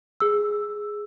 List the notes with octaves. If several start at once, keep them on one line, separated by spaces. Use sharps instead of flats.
G#4 E6